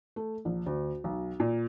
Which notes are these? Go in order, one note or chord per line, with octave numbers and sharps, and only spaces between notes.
A3
A#1
D2
B1
A#2